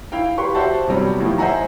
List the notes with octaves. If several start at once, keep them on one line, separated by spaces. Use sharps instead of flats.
E4 F5 G5
G4 B4 C6 C#6
F#4 G4 C5 E5 F#5 A5
C3 F#3 G3 B3 C#4
D#3 F3 A3 E4
C5 D#5 E5 F#5 G#5 A#5